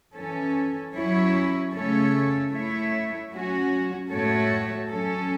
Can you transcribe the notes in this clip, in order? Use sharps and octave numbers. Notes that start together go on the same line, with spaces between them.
E3 C#4 A4
F#3 C#4 E4 C#5
C#3 A3 C#4 A4 C#5
A3 E4 C#5 E5
F#3 C#4 F#4
A2 A3 F#4 A4 C#5
F#3 C#4 A4